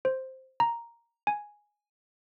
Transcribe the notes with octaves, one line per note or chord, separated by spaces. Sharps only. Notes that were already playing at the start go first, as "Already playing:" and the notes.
C5
A#5
G#5